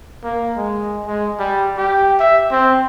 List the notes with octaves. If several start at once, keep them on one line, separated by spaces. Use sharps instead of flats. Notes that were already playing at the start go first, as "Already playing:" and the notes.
A#3
G#3
G#3
G3
G4
E5
C4